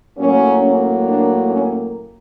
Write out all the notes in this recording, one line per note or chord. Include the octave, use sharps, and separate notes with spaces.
A2 F#3 A#3 C#4
C#4
D4
C#4